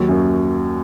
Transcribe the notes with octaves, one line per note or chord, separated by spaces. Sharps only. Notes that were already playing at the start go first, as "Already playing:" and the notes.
Already playing: D#2 F#3
F#2